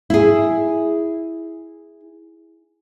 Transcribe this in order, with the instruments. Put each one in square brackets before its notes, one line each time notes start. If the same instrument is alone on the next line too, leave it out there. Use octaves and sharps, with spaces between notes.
[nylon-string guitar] E4 G#4